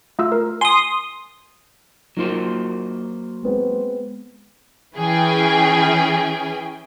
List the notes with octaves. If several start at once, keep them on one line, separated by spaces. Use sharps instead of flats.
A3 F4 E6
A#4
G#5 C6 D#6
F#3 A#3 D#4 F4 F#4 C5
G#3 B3 C4
E3 C#4 G#4 G5 G#5